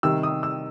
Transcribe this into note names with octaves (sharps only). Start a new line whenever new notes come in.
C3 D#3 G3 E6
D#6
E6